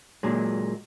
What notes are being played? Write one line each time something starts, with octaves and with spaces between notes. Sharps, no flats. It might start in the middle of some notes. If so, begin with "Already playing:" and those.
A#2 F#3 G#3